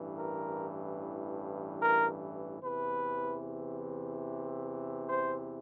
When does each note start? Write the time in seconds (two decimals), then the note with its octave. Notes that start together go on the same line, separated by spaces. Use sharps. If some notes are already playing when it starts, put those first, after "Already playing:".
Already playing: A1 G2 E3
0.16 A#4
1.80 A#4
2.61 E2 C3 E3 B4
5.08 C5